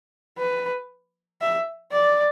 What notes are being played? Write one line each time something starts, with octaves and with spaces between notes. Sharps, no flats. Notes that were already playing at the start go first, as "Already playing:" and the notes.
B4
E5
D5